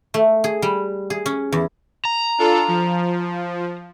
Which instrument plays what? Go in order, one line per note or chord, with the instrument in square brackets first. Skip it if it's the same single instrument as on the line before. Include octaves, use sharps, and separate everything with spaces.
[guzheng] A3
G#4
G3
G#4
C#4
E2
[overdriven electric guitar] A#5
[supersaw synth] D4 F4 A4
F3